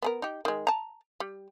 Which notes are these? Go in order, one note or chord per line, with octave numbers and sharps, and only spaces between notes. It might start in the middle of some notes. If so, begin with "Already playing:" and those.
B3 G#4 A#4
D#4 G4
D#3 G#3
A5 A#5
G3